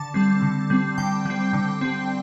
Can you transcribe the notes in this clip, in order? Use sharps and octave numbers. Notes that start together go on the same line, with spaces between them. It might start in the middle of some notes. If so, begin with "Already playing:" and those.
Already playing: D3 A5
G3 C4
D3
G3 C4
D3 G5
G3 C4
D3
G3 C4